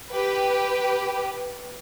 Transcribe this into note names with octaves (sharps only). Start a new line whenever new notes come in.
G4 B4